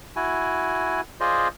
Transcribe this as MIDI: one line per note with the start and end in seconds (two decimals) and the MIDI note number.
0.16 1.01 64
0.16 1.01 66
0.16 1.01 80
1.20 1.48 65
1.20 1.48 68
1.20 1.48 72
1.20 1.48 74
1.20 1.48 75